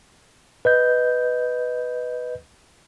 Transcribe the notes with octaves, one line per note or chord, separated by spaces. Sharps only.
B4 D#5 G6